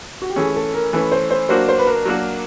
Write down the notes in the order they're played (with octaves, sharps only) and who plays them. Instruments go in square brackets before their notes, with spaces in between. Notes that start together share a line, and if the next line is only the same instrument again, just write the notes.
[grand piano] F#4
G4
[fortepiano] E3 A3 C#4 [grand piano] G#4
[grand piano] A4
A#4
[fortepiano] E3 A3 C#4 [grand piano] B4
[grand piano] C5
C5
[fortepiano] F#3 A#3 D4 F#4 [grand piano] C5
[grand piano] C5
B4
A#4
[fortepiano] F#3 A#3 D4 F#4